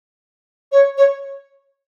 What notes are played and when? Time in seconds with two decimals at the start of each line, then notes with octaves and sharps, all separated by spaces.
0.71 C#5
0.97 C#5